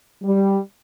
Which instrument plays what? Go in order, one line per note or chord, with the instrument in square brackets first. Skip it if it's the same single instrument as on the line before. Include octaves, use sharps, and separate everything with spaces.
[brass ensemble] G3